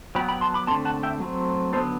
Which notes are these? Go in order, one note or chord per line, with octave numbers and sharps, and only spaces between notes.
F#3 B3 G5 B5
G5 B5
A5 C6
B5 D6
D3 A3 C4 A5 C6
F#5 A5
E5 G5
F#3 A3 C4
D3 F#3 B3 A4 C5